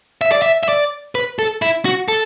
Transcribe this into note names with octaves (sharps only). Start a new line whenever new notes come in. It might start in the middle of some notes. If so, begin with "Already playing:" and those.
E5
D5
E5
E5
D5
B4
A4
E4
F#4
A4